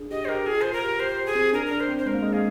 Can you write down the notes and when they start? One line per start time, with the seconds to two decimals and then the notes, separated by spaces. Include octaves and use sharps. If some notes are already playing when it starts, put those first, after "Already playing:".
Already playing: D4 G#4
0.11 G4 D#5
0.25 C5
0.29 G4 A#4
0.46 F4 G#4
0.61 F4 C5
0.73 A#4
0.83 G4
1.00 G4 C5
1.18 G4
1.26 G#4
1.35 C4
1.53 D4 A#4
1.66 D4 A#4
1.80 C5
1.89 C4
1.98 C5
2.06 G#3 A#4
2.14 A#3
2.22 G#3
2.33 A#3 G#4